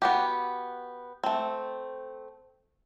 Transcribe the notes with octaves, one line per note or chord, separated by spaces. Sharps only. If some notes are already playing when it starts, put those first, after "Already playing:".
B3 F#4 G4
A3 C4